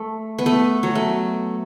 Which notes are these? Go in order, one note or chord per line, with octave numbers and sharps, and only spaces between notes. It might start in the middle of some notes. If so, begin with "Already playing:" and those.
Already playing: A3
B3
A3
F#3
A3